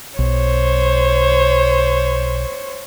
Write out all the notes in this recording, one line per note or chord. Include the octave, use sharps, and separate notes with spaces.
B1 C5 C#5